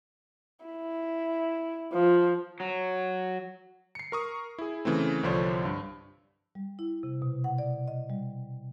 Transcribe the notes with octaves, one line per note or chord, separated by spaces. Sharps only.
E4
F3
F#3
C7 C#7
A#4 C#6 D#6
E4 G#4
C#3 E3 A3 C4
C2 D3 F3 D4 C5 C#5
G2
G3
E4
C3
B2
F#5
D5
D#5
G3